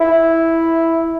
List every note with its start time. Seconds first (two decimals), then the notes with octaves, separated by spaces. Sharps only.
0.01 E4